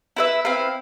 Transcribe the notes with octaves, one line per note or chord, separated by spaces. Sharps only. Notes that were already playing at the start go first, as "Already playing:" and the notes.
E4 B4 E5
C4 E4 B4 F5